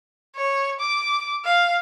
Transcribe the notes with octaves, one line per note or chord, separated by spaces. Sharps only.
C#5
D6
F5